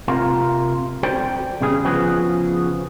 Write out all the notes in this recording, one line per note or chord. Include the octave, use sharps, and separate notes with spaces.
C3 A#3 F4 A#4
F#4 A4 C5 D5 G5
E2 C#3 G3 G#4
C#3 F3 B3 C#4 F#4 G#4